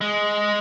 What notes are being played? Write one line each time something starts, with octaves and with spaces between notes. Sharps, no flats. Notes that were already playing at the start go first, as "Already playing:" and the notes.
G#3